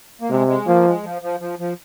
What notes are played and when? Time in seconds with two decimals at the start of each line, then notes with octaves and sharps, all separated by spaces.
0.21 A#3
0.30 C3 G#3
0.48 G#3
0.66 F3 A#3
0.86 G#3
1.04 F3
1.22 F3
1.40 F3
1.59 F3